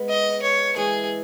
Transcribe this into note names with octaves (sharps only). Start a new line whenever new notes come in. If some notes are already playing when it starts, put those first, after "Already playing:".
Already playing: G#3 B3
D#5
C#5
E3 G#3 G#4